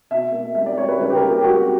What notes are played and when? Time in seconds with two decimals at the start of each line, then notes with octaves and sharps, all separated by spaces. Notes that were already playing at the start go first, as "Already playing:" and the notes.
0.11 B2 E5
0.32 A#3
0.55 G3 E5
0.66 D5
0.77 G3 C#5
0.89 B4
1.00 C#3 B4
1.10 G4
1.15 A#4
1.22 A#3
1.30 G4
1.41 G4
1.44 G3 F#4